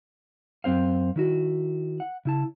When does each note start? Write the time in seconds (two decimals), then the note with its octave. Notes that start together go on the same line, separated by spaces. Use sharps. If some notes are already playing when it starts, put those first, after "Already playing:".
0.64 F#2 C4 C5 F5
1.16 D#3 E4 F#4
2.00 F#5
2.25 C#3 E4 A5